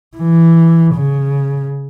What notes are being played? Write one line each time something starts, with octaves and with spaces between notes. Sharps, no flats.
E3
C#3